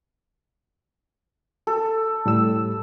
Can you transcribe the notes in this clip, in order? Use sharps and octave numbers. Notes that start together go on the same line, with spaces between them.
A4
A2 G3 E6